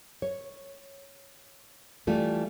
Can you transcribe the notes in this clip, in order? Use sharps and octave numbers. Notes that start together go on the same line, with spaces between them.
C#5
E3 G3 A3 F4